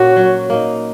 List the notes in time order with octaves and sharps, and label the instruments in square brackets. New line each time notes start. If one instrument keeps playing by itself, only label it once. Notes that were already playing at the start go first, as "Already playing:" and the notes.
Already playing: [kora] A#2 A#3 C#4 [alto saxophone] F#4
[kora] F#3
A#3 D#4